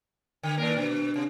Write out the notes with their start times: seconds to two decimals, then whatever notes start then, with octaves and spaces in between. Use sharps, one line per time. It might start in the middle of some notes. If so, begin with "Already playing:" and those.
0.43 D3
0.57 D#3 A#3 D4 A#4 D5
0.76 B2 D4
1.16 C3